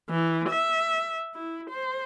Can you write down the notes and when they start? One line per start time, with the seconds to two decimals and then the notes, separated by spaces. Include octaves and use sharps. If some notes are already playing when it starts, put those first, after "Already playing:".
0.10 E3
0.49 E5
1.34 E4
1.70 C5